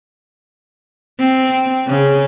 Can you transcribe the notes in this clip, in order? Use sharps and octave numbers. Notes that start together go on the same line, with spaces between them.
C4
C#3